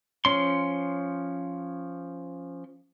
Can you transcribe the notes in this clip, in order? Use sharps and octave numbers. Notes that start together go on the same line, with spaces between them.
F3 C#4 C6